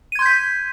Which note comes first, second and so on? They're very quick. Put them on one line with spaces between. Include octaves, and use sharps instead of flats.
D#7 G#6 C6 G6 B6